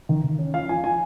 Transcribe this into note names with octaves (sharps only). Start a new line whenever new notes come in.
D#3
D#3
C#4
F3 F5
F3 G#5
F3 G#5